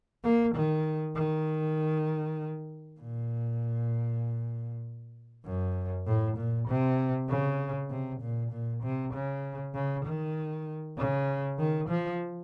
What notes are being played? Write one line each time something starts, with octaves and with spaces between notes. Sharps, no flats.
A#3
D#3
D#3
A#2
F#2
A2
A#2
C3
C#3
C3
A#2
A#2
C3
C#3
C#3
D#3
C#3
D#3
F3